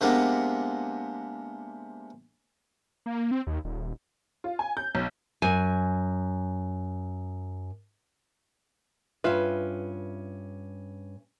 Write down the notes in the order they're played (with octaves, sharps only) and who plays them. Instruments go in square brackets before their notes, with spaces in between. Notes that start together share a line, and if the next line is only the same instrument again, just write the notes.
[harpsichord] C3 G#3 A#3 B3 D4
[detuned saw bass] A#3
C4
D#2
D#1
[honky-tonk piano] F4
G#5
G6
B1
[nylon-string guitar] F#2 G#5
[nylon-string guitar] G2 C#4 E5 [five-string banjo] F4 B4